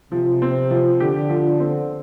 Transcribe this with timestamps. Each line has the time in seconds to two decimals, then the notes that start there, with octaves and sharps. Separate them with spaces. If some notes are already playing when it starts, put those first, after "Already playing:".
0.12 C3 F3
0.42 C4
0.71 F3
1.00 D3 G4
1.30 F3
1.60 C4